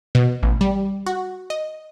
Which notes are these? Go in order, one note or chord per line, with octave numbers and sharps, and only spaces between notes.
B2
A1
G3
F#4
D#5